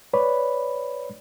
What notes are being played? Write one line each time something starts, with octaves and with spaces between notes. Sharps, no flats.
B4 C#5 D5 B5